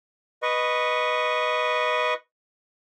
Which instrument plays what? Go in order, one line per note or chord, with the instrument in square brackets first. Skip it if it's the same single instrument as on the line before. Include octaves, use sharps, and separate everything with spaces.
[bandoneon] B4 D#5 C#6